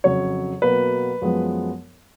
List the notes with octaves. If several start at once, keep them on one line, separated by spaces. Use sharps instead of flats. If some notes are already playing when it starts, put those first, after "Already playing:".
F2 C#3 F#3 C#5
B2 F#3 A#3 B4
F#2 F3 G#3 B3